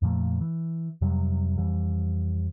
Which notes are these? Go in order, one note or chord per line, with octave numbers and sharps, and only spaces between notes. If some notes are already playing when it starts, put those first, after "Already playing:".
F2 A#2 F3 A3
E3
F2 C3 F#3 G3
F2 E3 G3